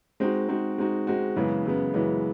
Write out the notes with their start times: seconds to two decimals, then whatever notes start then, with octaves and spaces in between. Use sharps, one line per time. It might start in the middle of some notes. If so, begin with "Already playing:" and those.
0.20 G#3 C4 D#4 F#4
0.48 G#3 C4 D#4 F#4
0.78 G#3 C4 D#4 F#4
1.07 G#3 C4 D#4 F#4
1.36 F#2 C#3 E3 G#3 B3
1.65 F#2 C#3 E3 G#3 B3
1.94 F#2 C#3 E3 G#3 B3